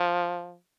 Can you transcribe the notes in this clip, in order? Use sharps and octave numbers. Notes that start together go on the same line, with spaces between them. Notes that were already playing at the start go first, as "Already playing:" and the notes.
Already playing: F3